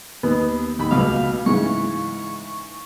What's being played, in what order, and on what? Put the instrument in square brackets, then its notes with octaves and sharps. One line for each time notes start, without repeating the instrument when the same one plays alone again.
[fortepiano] D#2 [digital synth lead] B3
[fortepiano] D#2 B5
[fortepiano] C#2 B2 [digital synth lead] F5
[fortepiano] G#2 C#3 E3 [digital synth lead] C#6